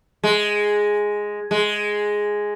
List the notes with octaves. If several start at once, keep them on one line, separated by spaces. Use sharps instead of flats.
G#3
G#3